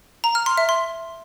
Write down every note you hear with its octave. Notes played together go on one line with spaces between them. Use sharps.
A#5
F6
C6
E5
C6